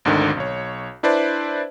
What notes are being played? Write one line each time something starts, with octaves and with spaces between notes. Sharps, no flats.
G#1 D2 G#2 D3 D#3
B1 C#5
D4 E4 B4 C5 D5 A5